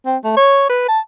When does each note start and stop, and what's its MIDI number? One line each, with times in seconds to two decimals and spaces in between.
0.06 0.18 60
0.24 0.33 57
0.37 0.66 73
0.69 0.85 71
0.89 0.99 81